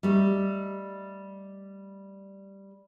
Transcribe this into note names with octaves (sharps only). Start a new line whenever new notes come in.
G3 A3 D#4